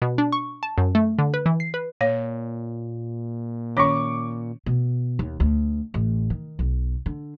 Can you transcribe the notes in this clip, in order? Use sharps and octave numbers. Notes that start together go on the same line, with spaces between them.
B2
D4
C#6
A5
F#2
A3
D3
B4
E3
C7
B4
A#2 C#5 F5
D#3 C#4 C#5 C#6 D6
B2
D#2
D2
A1
D#3
B1
D3